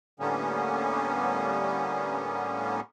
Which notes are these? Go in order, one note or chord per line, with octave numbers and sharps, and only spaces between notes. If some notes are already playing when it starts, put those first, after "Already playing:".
A2 D3 G3 A#3 B3 C#4